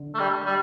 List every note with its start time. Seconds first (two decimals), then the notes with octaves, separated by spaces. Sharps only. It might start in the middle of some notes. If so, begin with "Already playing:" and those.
Already playing: D3
0.15 A3
0.19 G3
0.46 G3